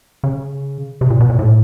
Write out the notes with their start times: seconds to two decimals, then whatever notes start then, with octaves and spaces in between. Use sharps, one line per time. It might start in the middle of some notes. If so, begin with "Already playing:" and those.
0.24 C#3
1.01 C3
1.10 A#2
1.20 B2
1.30 A#2
1.39 A2